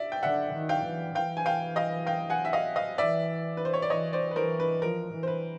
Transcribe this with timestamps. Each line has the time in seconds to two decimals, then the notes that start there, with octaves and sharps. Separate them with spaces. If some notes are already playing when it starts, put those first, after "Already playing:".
Already playing: D5 E5
0.12 G5
0.23 D3 E5 F#5
0.54 D#3
0.69 F5 G5
0.84 E3
1.15 E3 F5 G5
1.37 G#5
1.46 F5 G5
1.76 D#5 F5
2.07 F5 G5
2.30 F#5 G#5
2.45 E5
2.53 D#5 F5
2.76 D#5 F5
2.98 E3 D5 E5
3.57 B4
3.65 C5
3.74 C#5
3.82 D5
3.90 E3 C#5 D#5
4.13 C5 D5
4.31 B4
4.36 E3 A#4 C5
4.60 B4
4.82 F3 A#4
5.13 E3
5.23 C5
5.27 B4